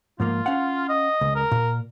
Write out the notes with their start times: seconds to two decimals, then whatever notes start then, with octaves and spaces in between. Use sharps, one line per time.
0.20 G#2 F3 A#3 F4
0.46 C#4 F5 F#5
0.89 D#5
1.21 C#2
1.35 A#4
1.51 A#2